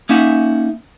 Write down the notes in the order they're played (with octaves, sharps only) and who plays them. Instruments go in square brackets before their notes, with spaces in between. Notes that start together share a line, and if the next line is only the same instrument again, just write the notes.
[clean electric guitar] A#3 C#4 D#4 E5 F#5